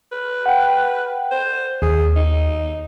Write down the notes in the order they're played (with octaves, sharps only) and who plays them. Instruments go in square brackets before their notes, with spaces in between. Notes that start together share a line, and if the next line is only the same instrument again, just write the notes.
[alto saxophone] B4
[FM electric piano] F#5 G5
[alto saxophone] C5
[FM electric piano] D#2 [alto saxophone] G#4
[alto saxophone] D#4